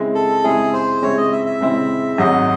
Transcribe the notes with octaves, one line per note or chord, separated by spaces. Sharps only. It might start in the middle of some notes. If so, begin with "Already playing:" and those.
Already playing: C#3 G#3 C4 E4
A4
C#3 G#3 C4 E4 G#4
C5
C#3 G#3 C4 E4 C#5
D#5
E5
E5
C#3 G#3 C4 E4
G#1 G#2 F#3 D#5